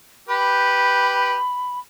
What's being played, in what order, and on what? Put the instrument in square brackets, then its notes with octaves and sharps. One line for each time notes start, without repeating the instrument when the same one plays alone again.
[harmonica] G4 B4 [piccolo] B5